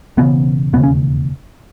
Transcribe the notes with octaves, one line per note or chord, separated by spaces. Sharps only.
E1 E2 C#3 B3
E1 D#2 C#3 B3
C#4